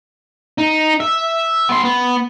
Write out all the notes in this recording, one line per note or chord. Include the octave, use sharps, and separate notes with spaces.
D#4
E5
B3 C6
B3